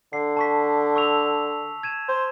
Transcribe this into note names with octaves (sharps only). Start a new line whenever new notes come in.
D3 C7
A5 C#6 B6
C#6 E6 F7
G#6 D#7 E7
C5